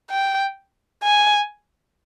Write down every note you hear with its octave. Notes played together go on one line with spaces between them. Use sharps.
G5
G#5